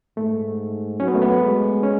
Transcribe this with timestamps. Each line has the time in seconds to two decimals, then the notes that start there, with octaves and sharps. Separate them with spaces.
0.17 G#2 A3
1.00 F#3 C#4
1.08 B3
1.15 A3
1.22 B3
1.41 G#3
1.83 C#4